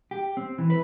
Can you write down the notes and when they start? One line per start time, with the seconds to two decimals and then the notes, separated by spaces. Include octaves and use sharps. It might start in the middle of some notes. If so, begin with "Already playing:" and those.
0.11 G4
0.37 C4
0.58 E3
0.70 B4